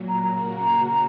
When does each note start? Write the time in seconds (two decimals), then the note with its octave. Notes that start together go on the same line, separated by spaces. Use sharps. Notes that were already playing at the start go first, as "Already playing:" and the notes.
Already playing: A#2 F#3
0.09 A#5
0.24 C#3 A#3 F#4 A#5